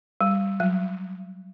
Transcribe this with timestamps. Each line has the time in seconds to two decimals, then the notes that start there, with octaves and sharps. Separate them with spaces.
0.21 G3
0.60 F#3